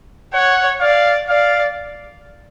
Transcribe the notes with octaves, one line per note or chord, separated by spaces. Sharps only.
C#5 F#5
D5 F5
D5 F5